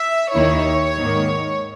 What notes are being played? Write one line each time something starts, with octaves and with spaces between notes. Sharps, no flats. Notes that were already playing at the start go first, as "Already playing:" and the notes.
Already playing: E5
D#2 D#3 A#3 E4 C#5
G#2 D#3 A#3